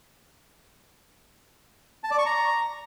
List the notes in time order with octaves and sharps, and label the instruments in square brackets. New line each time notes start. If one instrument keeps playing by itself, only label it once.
[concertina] A5
D5
C#6
A#5